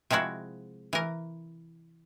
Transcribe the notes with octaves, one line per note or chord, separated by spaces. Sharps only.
C3 F3 G#3 E4 F#4
E3 A#4